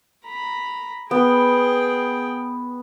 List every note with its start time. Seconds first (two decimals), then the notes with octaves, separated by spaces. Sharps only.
0.24 A#5 B5
1.11 B3 G#4 G5